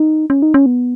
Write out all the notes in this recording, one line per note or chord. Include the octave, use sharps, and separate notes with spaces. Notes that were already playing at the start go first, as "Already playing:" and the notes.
Already playing: D#4
C#4
D#4
C#4
B3